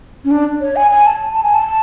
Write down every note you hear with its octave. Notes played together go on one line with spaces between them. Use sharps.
C#4
D4
C#5
G#5
G#5
A5
A5
G#5
A5